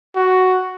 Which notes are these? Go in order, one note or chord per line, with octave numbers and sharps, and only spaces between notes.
F#4